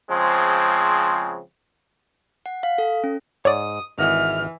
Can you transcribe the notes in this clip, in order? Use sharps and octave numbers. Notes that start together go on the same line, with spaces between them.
C#3 F3 G#3 C4
F#5
F5
A4
C#4
G#2 C#5 D5 D#6
G#1 E3 D#5 F#5 F6